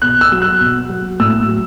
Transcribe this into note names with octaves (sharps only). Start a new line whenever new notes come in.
B2 F#6
E6
F#3
F#6
B2
F#3
A2 E6
F#3